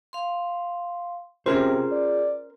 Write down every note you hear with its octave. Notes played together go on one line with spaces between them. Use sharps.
F5 C6
C3 C#4 F4 G#4 A#4 C5
D5